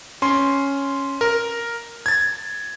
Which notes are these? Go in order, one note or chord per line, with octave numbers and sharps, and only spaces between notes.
C#4 C6
A#4
G#6 A6